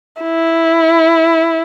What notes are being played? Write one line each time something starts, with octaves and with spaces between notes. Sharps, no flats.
E4